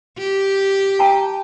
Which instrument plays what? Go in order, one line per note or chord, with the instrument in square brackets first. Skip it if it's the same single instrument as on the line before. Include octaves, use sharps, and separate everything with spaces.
[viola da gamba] G4
[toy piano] G5 A5 A#5